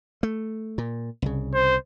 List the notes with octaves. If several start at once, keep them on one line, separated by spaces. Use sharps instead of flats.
A3
A#2
C2 C#3
C5